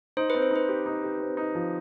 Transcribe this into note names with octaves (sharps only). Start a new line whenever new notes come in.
D#4 C5
C4 B4
C5
D#4 B4
G4
D#4
G4
C4
D#4
F3